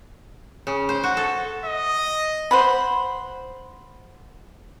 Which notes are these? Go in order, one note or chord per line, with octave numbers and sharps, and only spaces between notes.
C#3
C5
F#4
A4
D#5
C5 F#5 B5